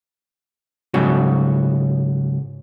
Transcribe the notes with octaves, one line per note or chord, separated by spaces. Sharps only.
G#2 C#3 F#3 F#4